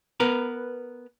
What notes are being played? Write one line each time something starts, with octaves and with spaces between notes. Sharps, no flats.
B3 A#4 B4